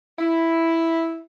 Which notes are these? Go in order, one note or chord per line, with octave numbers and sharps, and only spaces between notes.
E4